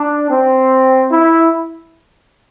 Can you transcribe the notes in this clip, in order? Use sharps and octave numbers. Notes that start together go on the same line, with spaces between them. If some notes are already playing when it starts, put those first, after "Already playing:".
Already playing: D4
C4
E4